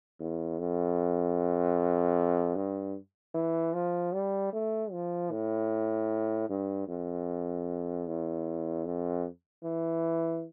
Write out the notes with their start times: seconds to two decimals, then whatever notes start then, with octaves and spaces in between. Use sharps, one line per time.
0.20 E2
0.59 F2
2.56 G2
3.34 E3
3.74 F3
4.13 G3
4.53 A3
4.92 F3
5.31 A2
6.49 G2
6.88 F2
8.07 E2
8.85 F2
9.63 E3